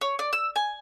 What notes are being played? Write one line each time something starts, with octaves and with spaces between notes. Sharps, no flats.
C#5
D5
E6
G#5